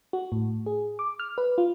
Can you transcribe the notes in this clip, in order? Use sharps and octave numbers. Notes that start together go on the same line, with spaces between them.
F#4
A2
G#4
D6
F6
B4
F4